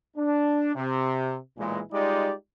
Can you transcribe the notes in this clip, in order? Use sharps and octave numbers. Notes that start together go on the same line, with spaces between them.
D4
C3
B1 A#2 E3 G#3
G3 G#3 D#4 F4 G4 D5